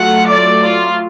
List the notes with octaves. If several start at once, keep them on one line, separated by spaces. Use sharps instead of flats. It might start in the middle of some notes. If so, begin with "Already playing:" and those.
Already playing: F#3 A3 F4 F#5
D5
F4